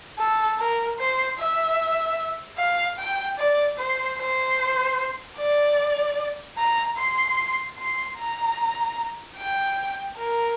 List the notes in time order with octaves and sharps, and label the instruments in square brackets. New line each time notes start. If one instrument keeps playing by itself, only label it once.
[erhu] A4
A#4
C5
E5
F5
G5
D5
C5
C5
D5
A#5
C6
C6
A#5
G5
A#4